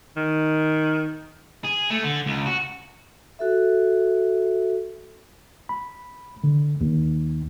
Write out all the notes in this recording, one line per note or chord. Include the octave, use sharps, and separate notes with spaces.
D#3
G#4
A3
D3
C#2
F#4
F#4 A4 E5
B5
D3
D#2